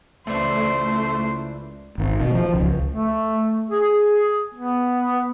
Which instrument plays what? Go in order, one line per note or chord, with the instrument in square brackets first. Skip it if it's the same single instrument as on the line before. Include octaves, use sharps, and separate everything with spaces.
[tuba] C#2 [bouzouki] E3 D4 [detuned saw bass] A3 [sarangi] C5
[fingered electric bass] G#1
B2
F3
C#2
[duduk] A3
G#4
B3